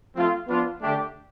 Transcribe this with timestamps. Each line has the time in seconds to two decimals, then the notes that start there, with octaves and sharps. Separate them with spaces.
0.14 F3 A3 C4 F4
0.48 F3 B3 D4 F4
0.81 D3 A3 D4 G4